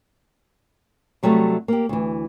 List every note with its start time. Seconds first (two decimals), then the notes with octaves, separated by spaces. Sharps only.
1.23 C3 F#3 G3 A3
1.68 A#3 G4
1.89 D2 E3